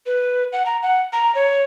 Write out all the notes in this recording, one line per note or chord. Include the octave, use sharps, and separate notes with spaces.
B4
F#5
A#5
F#5
A#5
C#5